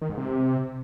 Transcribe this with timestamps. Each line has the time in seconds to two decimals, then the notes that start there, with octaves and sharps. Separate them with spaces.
0.02 D#3
0.10 G#2
0.18 C3